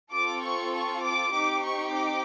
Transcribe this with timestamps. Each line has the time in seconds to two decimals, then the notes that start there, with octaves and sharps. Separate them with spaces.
0.11 C4 F4 A4 D6
0.42 C#6
0.73 C#6
1.03 D6
1.33 C4 D#4 G4 D6
1.63 C#6
1.94 D6